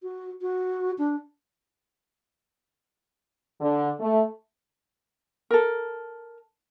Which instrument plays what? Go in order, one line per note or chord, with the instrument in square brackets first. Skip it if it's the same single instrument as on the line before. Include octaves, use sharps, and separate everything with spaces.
[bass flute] F#4
F#4
D4
[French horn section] D3
A3
[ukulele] A4 A#4